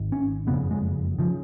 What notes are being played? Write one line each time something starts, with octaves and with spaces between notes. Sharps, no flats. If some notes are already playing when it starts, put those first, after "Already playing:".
Already playing: G#1 G#2
C#4
F#1 F2 C#3 B3
G#3
C#3 F3